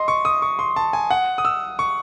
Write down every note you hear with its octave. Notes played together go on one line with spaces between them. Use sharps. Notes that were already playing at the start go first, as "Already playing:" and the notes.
Already playing: D#5 C6
C#6
D#6
C#6
C6
A5
G#5
F#5
D#6
E6
C#6